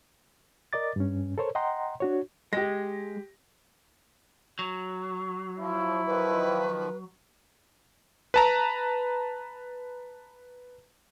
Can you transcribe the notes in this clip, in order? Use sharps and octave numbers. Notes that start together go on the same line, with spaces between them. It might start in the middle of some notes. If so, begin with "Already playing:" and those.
A#4 D5 D#5 D6 A6
G2 C#4
A4 A#4 C5 C#5
D#5 F#5 G5 A#5 C6
D4 F#4 C#5
G#3 G4 A#6
F#3
F3 E4
D#3 F3 B4
B4 A5 A#5